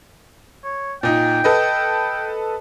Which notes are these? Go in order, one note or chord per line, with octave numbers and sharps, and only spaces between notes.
C#5
A#2 D#4 G5
A4 B4 D#5